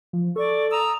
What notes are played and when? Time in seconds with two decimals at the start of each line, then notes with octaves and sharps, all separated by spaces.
0.13 F3
0.36 A4 D5 C#6
0.70 A#5 D#6 E6